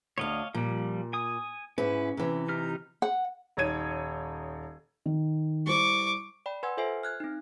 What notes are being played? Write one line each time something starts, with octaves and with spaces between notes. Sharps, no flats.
D2 D4 C#5 D#5 F5
A#2 F3 G3
G#5 D#6
G#2 C#4 E4 B4
C3 E3
D#4 G4 F6
F#5
D#1 D#4 C#5 G#6 D#7
D#3
G3 E4 C5 C#6 D6
D5 G5 B5
B4 F#5 G#5 C6 E6 G#6
F4 A4 C5 E5 G#5 C7
F6 F#6 G#6
C4 D#4